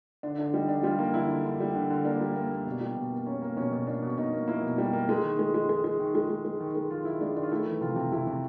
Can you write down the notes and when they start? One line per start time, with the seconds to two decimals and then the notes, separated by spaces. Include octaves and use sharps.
0.23 D3 D4
0.38 D3 D4
0.54 G3 D#4
0.69 D3 D4
0.83 G3 F4
0.99 A#3
1.14 D3 E4
1.29 D3
1.44 D3
1.60 G3
1.75 D3
1.90 D3
2.05 A#3 D4
2.21 G3
2.36 A#3
2.51 A#3
2.66 B2
2.81 G3
2.96 B2
3.11 A#3
3.27 A#3 C#4
3.42 A#3
3.57 B2 C#4
3.72 B2
3.87 A#3 D4
4.03 B2
4.18 B2 D#4
4.33 A#3
4.48 A#3 E4
4.63 B2
4.78 G3
4.93 A#3
5.09 G#3
5.23 D#3
5.39 G#3
5.54 G#3
5.69 G#3
5.84 G#3
5.99 D#3
6.15 G#3
6.29 G#3
6.45 G#3
6.60 D#3
6.75 G#3
6.90 D#3 F4
7.05 D#3 E4
7.21 G#3 D4
7.36 D#3 D4
7.43 F4
7.52 A3 E4
7.67 E3
7.81 C3 F4
7.96 C3
8.12 C3 E4
8.27 C3